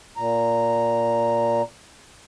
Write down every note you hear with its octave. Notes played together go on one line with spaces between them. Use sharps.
A#2 A#5